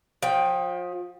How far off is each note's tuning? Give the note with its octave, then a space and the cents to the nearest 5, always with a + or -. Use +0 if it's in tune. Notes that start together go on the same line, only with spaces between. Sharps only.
F3 +30 G5 +0